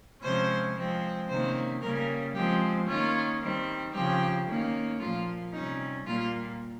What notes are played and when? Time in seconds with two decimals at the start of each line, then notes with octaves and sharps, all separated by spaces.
0.22 C3 F3 G#3 C#4 C5
0.75 F3 G#3 C4
1.29 C3 D#3 A#3 C#4 C5
1.82 C#3 G3 A#3 C#4 A#4
2.35 F3 G#3 C4 G4
2.87 D#3 A#3 C#4 F4
3.41 D#3 G3 C4
3.94 C#3 F3 C4 G4
4.47 D#3 A#3 C#4
5.00 A#2 F3 A#3 F4
5.53 C3 G3 C#4 D#4
6.06 A#2 G3 A#3 F4